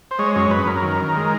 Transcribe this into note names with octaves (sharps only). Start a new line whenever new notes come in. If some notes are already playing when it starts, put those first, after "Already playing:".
C5
G#3 C#5
F#2 C#5
F#2 B4
F#2 A#4
D#3
D#3
G#3